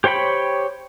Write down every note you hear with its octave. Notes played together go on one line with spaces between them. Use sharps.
G4 C5 C#5 G5 B5